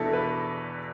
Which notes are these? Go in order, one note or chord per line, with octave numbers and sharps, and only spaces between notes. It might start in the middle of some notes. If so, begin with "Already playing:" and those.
Already playing: E2 B2 D4 E4 A4
B4